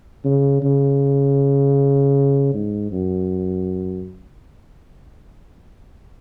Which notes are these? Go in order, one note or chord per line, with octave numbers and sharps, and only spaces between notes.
C#3
C#3
G#2
F#2